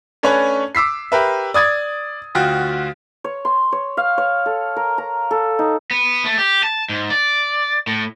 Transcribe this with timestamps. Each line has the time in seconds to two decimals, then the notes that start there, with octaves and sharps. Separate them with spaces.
0.23 A3 C#4 D4 B4 C#5 G#5
0.75 D6 E6 B6 C7
1.12 G4 A#4 B4 E5
1.54 D5 D#6 G#6 A6
2.35 D2 F4 F#4 G5
3.24 C#5
3.45 C6
3.72 C#5
3.97 F5
4.18 C#5
4.46 A4
4.76 A#4
4.98 A#5
5.31 A4
5.59 D#4
5.91 B3
6.25 A3
6.38 G4
6.63 A5
6.89 G#2
7.10 D5
7.87 A2